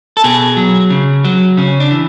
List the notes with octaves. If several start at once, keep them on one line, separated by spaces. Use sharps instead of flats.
A4
B2 G#4
F#3
C#3
F#3
C#3 C#4
D4
E3